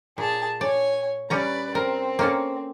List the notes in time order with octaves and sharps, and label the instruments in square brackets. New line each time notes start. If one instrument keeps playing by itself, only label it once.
[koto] A#2 [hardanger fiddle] G#4 A5
[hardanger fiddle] C#5 G#5 [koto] D5
[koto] G3 C#4 A#5 [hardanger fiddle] B4 D5
[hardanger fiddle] C4 [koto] A#4
[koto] A#3 C#4 A4